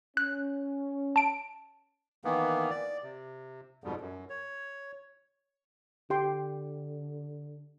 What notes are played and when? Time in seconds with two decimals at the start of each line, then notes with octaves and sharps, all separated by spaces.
0.17 C#4 F#6
1.16 A5 D7
2.25 D#3 E3 A#3 B3
2.70 D5
3.03 C3
3.84 F2 G#2 B2 G3
4.01 F#2
4.30 C#5
6.10 D3 G4 G5 C6